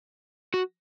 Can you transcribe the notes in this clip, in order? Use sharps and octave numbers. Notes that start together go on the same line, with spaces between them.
F#4